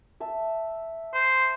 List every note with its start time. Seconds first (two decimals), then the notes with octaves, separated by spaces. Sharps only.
0.20 E5 A5
1.14 C5